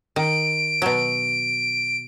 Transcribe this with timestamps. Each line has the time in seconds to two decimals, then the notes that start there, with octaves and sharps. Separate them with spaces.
0.16 D#3 D7
0.82 B2 F#3